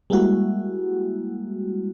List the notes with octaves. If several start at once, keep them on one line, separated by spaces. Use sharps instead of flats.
G3 G#3 A#3 E4 F#4